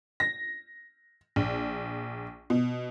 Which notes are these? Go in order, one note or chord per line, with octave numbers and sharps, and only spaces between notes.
A#6
A#1
B2